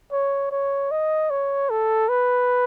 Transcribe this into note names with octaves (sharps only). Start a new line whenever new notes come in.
C#5
C#5
D#5
C#5
A4
B4